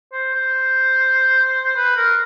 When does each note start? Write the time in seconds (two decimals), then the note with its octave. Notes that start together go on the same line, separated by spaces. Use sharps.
0.13 C5
0.34 C5
1.77 B4
1.96 A#4